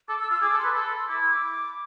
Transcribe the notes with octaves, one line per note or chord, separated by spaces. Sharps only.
A4 D6
E6
F4 E6
G#4 D6
A4
C6
B4
A4 C6
B5
C6
E4 D6
E6
D6